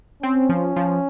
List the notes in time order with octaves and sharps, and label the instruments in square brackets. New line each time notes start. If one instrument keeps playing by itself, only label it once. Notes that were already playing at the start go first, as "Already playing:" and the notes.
[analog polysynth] C4 [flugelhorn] C#4
[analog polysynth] F3
F3